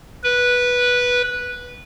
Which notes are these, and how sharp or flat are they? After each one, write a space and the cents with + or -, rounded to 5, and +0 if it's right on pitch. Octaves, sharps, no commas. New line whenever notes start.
B4 -10